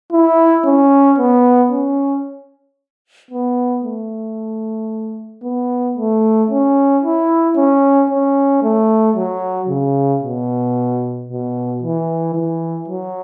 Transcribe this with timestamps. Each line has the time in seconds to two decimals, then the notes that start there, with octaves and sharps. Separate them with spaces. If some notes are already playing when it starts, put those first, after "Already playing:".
0.13 E4
0.65 C#4
1.19 B3
1.72 C#4
3.31 B3
3.84 A3
5.44 B3
5.97 A3
6.51 C#4
7.04 E4
7.57 C#4
8.10 C#4
8.63 A3
9.16 F#3
9.69 C#3
10.23 B2
11.29 B2
11.82 E3
12.35 E3
12.88 F#3